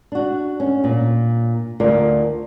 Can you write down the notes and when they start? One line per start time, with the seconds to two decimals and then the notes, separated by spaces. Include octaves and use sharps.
0.12 D4 F#4
0.60 C#4
0.84 A#2
1.80 D2 F4 A#4 D5